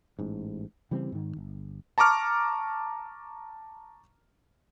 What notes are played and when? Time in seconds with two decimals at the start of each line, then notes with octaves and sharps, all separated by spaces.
0.19 A1 G#2
0.91 C#3 E3 G3 C4
1.12 G#2 D#3
1.37 G1
1.98 A5 A#5 C#6 D6 F6